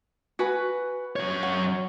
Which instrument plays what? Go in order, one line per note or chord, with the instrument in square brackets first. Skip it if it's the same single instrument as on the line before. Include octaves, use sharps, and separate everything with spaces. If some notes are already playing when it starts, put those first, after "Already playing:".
[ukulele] F#4 B4 G#5
[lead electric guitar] F#2 C#5
[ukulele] F#5